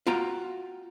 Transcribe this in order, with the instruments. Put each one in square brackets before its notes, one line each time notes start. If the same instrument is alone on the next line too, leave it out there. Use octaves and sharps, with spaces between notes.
[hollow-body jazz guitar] F4 F#4 G5 A#5